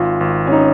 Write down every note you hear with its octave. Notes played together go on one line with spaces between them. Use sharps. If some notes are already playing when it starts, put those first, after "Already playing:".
Already playing: G#1 F4
G#1
C#4
D#4